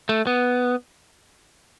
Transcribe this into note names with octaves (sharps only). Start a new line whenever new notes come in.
A3
B3